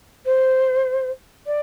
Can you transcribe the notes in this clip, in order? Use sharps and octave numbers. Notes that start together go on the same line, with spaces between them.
C5
D5